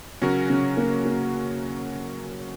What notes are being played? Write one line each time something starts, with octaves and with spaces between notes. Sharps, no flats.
C#3 F#3 C#4 F#4 A#4
C#3
A#3
A#3